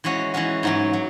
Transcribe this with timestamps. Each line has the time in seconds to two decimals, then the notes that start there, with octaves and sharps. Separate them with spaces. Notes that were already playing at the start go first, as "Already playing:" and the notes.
0.04 E3 G#3 C#4 F#4
0.34 E3 G#3 C#4 F#4
0.63 G#2 F#3 C#4
0.93 F#3